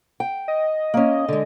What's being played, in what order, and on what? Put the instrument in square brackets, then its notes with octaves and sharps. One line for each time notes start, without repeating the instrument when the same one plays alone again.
[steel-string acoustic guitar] G5
[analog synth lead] D#5
[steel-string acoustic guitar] A#3 C#4
D3 G#3